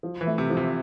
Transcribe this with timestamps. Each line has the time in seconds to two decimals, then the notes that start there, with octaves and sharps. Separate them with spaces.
0.03 F3
0.21 E3
0.27 A3
0.38 C3
0.50 F3
0.57 C3